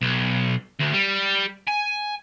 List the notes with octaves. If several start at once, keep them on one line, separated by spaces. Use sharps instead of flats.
B1
D2
G3
G#5